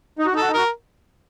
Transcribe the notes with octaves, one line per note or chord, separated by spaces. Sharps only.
D#4
F#4
D#4
A4
F#4
D#4
F#4 A#4